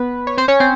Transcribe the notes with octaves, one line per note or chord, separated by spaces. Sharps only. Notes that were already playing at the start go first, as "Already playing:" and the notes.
Already playing: B3 B4
C#5
C4 C5
C#4 C#5
C4 C5